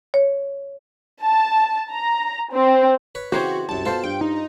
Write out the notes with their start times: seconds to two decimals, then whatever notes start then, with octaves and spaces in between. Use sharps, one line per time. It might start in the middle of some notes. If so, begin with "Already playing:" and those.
0.14 C#5
1.22 A5
1.91 A#5
2.52 C4
3.15 B4 C#5
3.32 C#3 E3 C4 F#4 G4 C5 C#5
3.69 C2 F#2 A5
3.85 B2 F4 A4 C5
4.04 G2 G5
4.21 D#4